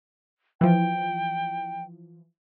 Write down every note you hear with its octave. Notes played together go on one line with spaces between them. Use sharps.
E3 F3 G5